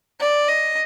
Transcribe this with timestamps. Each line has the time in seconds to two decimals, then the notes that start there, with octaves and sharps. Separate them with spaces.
0.20 D5
0.48 D#5